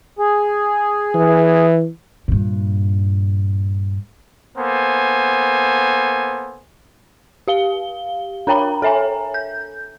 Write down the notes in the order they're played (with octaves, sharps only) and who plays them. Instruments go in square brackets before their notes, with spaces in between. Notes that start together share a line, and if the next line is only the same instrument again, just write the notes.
[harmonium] G#4
[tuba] E3
[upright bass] G2 A#2
[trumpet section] A#3 B3 A4 C5 G#5
[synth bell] G4 F5 G7
D4 A#4 C#5 G5 A#5 B5
A4 C#5 E5 G#5 A#5
G6